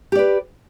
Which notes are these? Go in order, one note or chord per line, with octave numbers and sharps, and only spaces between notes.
G4 B4 D5